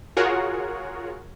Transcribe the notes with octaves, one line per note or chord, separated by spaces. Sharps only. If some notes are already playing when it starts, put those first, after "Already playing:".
F4 F#4 G#4 A#4 C#5 F#5